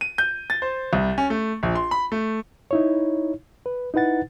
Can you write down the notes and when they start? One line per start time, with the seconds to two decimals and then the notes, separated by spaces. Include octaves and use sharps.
0.01 D#7
0.18 G6
0.50 A6
0.62 C5
0.93 C2
1.18 C#4
1.30 A3
1.63 A#1
1.75 C6
1.91 B5
2.12 A3
2.71 D#4 E4 C#5
3.66 B4
3.94 D#4 E4 B4 F#5 A6